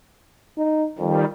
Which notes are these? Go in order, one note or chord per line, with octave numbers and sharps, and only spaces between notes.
D#4
F2 D#3 G3